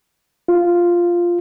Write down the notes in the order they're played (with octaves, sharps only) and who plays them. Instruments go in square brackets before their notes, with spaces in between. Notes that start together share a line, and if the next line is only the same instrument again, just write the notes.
[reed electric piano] F4